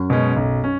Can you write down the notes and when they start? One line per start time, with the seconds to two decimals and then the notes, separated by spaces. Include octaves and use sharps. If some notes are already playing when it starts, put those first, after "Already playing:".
Already playing: F#2
0.10 B2 G#3 C#4
0.36 B1
0.64 C#4